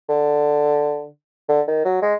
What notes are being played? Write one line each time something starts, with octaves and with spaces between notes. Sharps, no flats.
D3
D3
D#3
F#3
G#3